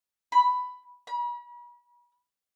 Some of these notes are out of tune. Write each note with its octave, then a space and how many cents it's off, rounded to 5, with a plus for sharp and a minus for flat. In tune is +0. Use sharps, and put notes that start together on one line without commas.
B5 +10
B5 -40